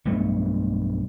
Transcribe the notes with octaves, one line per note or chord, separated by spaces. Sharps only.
B1 G2 A3